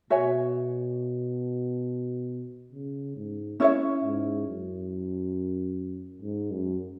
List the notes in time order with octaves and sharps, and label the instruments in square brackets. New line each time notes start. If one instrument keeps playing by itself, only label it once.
[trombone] B2 [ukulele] F#4 C#5 E5 G#5
[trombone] C#3
G#2
[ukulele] C#4 E4 C#5 E5
[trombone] G#2
F#2
G#2
F#2